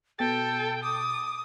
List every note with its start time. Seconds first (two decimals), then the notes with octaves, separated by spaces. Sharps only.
0.19 B2 A4 G5 A6
0.83 D6 D#6